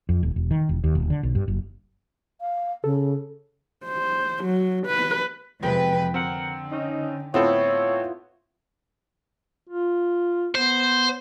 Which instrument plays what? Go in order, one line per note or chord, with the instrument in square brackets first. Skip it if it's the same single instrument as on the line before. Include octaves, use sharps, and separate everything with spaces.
[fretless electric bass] F2
D#1
E1
D#3
E1
D#2
D#1
D3
B1
G2
F#1
[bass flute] F5
[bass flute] C#3 [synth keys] A4
[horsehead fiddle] C5
F#3
B4
[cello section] F2 C3 B4 [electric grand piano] G#3 [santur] G5
[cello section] D3 [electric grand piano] C4 [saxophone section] A#4 F#5
[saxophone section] C#4 D#4
[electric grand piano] A2 C4 A4 [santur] B3 E4 F4 [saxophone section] C#5
[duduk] F4
[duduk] B3 [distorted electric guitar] C5